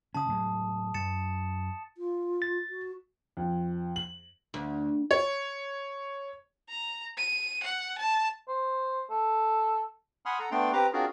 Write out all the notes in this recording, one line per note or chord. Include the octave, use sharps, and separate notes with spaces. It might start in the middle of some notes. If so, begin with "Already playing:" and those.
C#3 C#4 A5 D#6
A2 F#3 G#3
F#2 A6 C#7 E7
F4
A6
F#4
F2
F#7
D2
C#5
A#5
D#7
F#5
A5
C5
A4
F#5 G#5 B5 C6 D#6 F6
A4 F#5 A#5
A3 B3 D4 G5 C6
C4 G4 B4 A#5 D6
C4 D4 F4 F#4 G#4 A#4